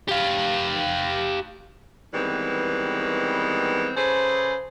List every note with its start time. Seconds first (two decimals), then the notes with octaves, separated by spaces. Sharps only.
0.09 G4 F5
2.14 D#3 E3 G3 G#3 B3 C4
3.97 C#3 G#4 A4 B4 C5